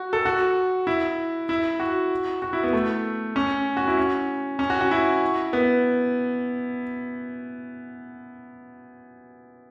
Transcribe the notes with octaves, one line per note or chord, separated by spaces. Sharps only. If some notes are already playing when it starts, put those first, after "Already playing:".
Already playing: F#4
A4
F#4
E4
E4
F#4
F#4
E4
B3
A3
C#4
F#4
E4
C#4
C#4
F#4
F#4
E4
B3